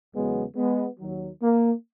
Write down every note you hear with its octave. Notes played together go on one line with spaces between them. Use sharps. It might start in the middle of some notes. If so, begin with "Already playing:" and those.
E2 C#3 F#3 G#3 B3
G#3 B3
D#2 D#3 F#3
A#3